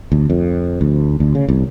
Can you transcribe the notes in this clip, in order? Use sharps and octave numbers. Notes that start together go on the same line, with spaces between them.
D2
F2
D2
D2
C#3
C2